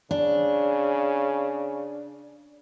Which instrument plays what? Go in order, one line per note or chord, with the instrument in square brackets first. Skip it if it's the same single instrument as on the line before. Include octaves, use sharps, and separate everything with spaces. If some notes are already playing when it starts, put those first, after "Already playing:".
[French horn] C#3 [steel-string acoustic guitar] D4